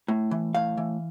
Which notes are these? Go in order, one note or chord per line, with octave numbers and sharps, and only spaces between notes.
A2
E3
A2 F5
E3